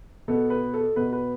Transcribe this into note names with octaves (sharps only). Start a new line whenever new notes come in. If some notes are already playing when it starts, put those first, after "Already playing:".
B2 B3 A4
B4
A4
B2 B3 B4
B4